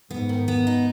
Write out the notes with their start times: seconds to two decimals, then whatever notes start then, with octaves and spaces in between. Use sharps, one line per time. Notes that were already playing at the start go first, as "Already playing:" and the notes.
0.10 G#2 B3
0.29 D#3
0.48 B3
0.67 D#4